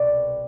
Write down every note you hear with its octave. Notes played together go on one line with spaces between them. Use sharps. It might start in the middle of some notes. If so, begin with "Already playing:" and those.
Already playing: C2 B2 D5